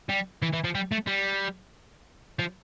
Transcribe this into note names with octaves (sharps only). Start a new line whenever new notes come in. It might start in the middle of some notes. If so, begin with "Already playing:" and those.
G3
E3
E3
F3
G3
A3
G3
F3